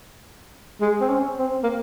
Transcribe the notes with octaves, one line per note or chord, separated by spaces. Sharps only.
G#3
C4
C#4
C4
A#3